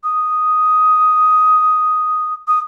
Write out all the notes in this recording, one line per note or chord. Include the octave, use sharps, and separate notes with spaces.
D#6
D#6